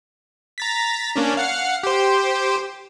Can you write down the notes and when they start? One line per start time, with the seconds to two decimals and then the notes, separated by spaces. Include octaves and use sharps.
0.58 A#5 A6 B6
1.16 A#3 C#4 D4
1.37 F5 F#5 F6
1.83 G4 C5